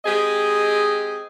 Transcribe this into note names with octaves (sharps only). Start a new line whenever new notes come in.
G#3 C4 G4 G#4 D#5